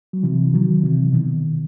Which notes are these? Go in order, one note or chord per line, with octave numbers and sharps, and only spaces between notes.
F#3
C3 E3
D#3 F#3
C3 E3
B2 D#3